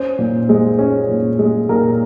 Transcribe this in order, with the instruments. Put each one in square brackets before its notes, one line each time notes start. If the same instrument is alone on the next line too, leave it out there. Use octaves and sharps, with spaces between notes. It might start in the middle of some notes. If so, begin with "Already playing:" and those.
Already playing: [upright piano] C#4 C5
A#2
G#3
C#4
A#2
G#3
A#2 A#4